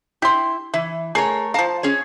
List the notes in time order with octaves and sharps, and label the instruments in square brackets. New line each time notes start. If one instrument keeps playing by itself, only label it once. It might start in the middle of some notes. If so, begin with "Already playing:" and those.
[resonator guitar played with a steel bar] E4 [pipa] G4 C6
[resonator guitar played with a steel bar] E3 [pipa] E4
[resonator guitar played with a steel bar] A3 A#4 C#5 [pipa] G#4
[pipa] F3 A#5 [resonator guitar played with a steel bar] F5 A5
[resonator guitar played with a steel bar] C#4 G#4 C#5